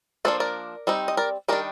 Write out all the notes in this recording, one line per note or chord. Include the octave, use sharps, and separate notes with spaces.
F3 A#3 D4 A4 C5
A#4 D5
G3 C4 D#4
D#5
A#4 D5
D#3 G3 D4 G4 A#4